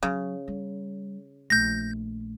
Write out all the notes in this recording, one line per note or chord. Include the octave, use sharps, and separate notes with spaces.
C#3 F#3
G3
A#1 A3 G6 A#6